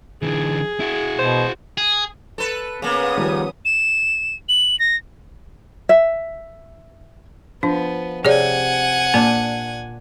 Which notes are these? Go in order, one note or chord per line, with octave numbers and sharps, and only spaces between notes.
D3 E3 G#4
E4 F#4
B2 C5
G#4
A4 B4
C#3 A#3 B3 C#4 D#6
D#3 F3 G3
E7
F#7
A#6
E5
F3 B3 D4
C3 G#4 C#5 D5 F#5 G#5
A#2 A#3 D4